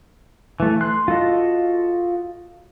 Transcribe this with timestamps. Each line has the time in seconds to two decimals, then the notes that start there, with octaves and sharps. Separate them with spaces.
0.60 E3 A3
0.81 C6 F#6
1.08 F4 F#4 A4 D#5